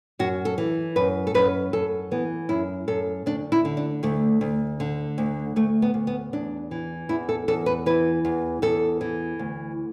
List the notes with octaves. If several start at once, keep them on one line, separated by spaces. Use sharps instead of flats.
F#2 F#4
A4
E3
F#2 B4
A4
F#2 B4
F#2 A4
E3 B3
F#2 E4
F#2 A4
D2 D4
E4
D3
D4
D2 A3
D2
D3
D2
D2 A3
B3
D2
B3
E2 D4
E3
E2 E4
A4
E2 A4
B4
E3 B4
E2
E2 A4
E3
D2